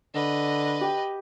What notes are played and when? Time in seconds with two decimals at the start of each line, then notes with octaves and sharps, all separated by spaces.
0.15 D3 B4 D#5
0.81 G4